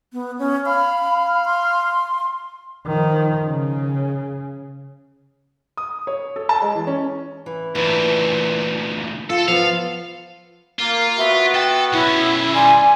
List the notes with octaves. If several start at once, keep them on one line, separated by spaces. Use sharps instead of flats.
B3
C#4
F5 B5
C6
D#3 F3
C#3
D#6
C#5
A4
A5
G#3
E3
C#4
E3
D2 A#2 E3
F4 A4
F3 B3 F5
A#3 F4
B3 F#4 E5
A4 G5 A5
B1 C#4 E4
G3 D5 G#5 C6